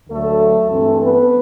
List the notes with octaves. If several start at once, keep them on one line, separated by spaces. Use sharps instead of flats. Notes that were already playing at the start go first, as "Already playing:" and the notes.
D2 D3 F#3 A3 A4
G2 E3 A3 C4
B3 B4